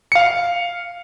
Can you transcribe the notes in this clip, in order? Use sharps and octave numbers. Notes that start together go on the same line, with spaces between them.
F5 C#7